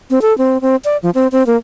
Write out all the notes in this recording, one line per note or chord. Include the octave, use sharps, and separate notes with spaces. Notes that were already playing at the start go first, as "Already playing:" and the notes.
C4
A4
C4
C4
D5
F3
C4
C4
A#3